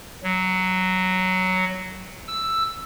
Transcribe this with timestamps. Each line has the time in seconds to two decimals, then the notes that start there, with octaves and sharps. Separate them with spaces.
0.23 F#3
2.27 E6